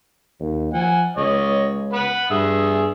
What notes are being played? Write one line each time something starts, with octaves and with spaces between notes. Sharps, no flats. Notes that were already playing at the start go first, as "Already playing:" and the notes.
D#2
F3 F#5 G#5
C#2 C#5 D#5
B4 F#5 B5
G2 G#4 E5